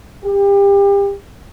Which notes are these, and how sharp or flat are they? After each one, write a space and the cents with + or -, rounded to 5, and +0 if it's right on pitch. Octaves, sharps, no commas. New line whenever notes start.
G4 +30